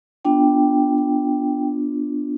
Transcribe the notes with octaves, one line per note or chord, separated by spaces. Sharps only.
B3 D4 F4 G5
G5